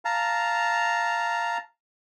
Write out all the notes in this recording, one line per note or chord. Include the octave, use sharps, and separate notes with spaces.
F5 A5 A#5